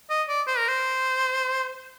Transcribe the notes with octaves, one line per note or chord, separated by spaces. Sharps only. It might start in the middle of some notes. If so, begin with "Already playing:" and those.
D#5
D5
C5
A#4
C5